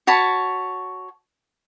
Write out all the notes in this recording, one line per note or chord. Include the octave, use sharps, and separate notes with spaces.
F#4 C#5 A5 B5